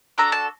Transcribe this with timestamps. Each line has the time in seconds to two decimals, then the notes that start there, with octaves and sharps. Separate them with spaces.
0.18 D4 F#4 A4 A#5
0.32 A5